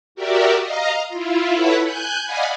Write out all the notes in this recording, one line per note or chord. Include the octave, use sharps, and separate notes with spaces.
F#4 G4 A#4 D5 E5
D#5 F5 A#5
E4 F4
E4 A4 B4 C#5 E5 F#5
G#5 F#6 G6
D5 D#5 F5 F#5 G#5 B5